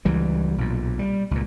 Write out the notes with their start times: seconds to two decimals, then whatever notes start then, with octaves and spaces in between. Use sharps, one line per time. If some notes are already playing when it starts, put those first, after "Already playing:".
0.05 C#2 E3 G3
0.58 B1 A#2
0.99 G3
1.31 C#2 A#2